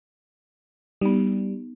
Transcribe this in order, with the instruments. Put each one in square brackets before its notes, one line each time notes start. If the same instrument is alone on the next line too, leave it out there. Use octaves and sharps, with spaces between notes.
[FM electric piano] G3 [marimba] B3 D#4